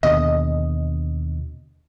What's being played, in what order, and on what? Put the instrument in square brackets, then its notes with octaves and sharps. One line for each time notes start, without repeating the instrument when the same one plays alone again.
[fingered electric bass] D#2 B2 D3 [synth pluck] D#5